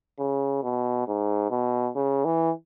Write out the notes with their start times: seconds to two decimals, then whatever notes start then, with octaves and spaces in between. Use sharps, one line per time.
0.19 C#3
0.63 B2
1.08 G#2
1.51 B2
1.96 C#3
2.25 E3